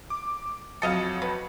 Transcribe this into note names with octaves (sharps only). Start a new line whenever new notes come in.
D6
F2 F#3 A4 D#5 F5 C#7
B4